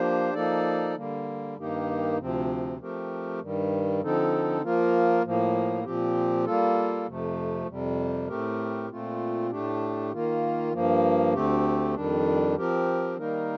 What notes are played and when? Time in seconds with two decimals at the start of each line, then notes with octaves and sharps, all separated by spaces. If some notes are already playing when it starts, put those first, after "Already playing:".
Already playing: F3 A#3 D4 G4 C5
0.34 F3 A#3 D#4 A4 D5
0.95 D3 G3 A#3
1.57 G2 D#3 A#3 D#4 G4
2.17 D2 C3 F3 C4
2.79 F3 A3 C4 G4 A#4
3.40 G2 D#3 G3
4.01 D3 F3 C4 D#4 A4
4.62 F3 A#3 F4 A#4
5.23 A2 F3 A#3
5.84 A#2 F3 C4 G4
6.45 G3 A#3 F4 A4
7.07 F2 C3 F3 A3
7.67 F2 C3 G3
8.28 A2 A3 C4 G4 A#4
8.90 A#2 A3 C4 F4
9.50 A2 A3 D4 G4
10.12 D#3 A#3 F4
10.73 G2 F3 A#3
11.33 D2 D3 A3 C4 G4
11.94 F2 D#3 G3 D4
12.56 F3 C4 G4 A#4
13.17 D#3 G3 A#3 D#4 A#4